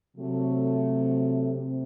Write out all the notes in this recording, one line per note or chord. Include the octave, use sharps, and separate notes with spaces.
C3 F#3 A3
C3